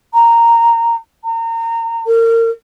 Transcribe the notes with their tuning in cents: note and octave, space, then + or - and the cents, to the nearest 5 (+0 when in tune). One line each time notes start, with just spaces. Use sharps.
A#5 -5
A#5 -30
A#4 -30